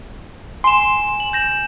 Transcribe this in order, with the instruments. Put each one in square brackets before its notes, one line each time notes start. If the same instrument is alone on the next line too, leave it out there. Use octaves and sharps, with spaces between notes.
[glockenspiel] G#5 E7 [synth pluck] C6
[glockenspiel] F#7
G6 A#6 E7